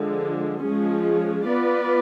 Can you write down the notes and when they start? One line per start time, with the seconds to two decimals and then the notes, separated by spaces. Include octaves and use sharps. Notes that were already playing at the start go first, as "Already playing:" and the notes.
Already playing: D3 F3 G#3
0.61 F3 G#3 C#4 G#4
1.46 B3 F4 B4 D5